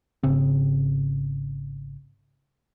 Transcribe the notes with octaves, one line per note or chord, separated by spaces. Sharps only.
G#1 C#3 C4